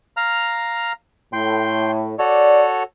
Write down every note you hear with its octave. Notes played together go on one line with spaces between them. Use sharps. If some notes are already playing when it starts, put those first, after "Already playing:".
F5 A#5 F6
A2 G5 C6
F#4 A4 C#5 D5